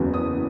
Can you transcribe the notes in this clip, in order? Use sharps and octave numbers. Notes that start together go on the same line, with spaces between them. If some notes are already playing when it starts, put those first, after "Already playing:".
Already playing: F#1 E2 C#3 F#3 B3
D#6